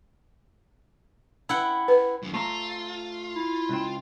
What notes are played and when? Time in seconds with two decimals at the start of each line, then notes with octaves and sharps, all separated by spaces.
1.49 E4 F#5 G5
1.88 B4
2.23 F#2 D#3
2.34 A3 C4 F4 A#5
3.36 E4
3.69 C#2 C4